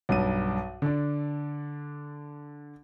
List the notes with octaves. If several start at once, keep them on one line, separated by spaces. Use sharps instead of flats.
B1 G2 D#7
D3 D4